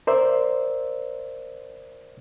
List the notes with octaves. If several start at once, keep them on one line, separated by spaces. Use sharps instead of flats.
A#4 C5 D5 E5